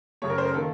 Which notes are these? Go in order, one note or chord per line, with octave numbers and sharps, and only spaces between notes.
F#2 C#3 A3 C#5
A#4
C5
A#4
D#3 A#3 A4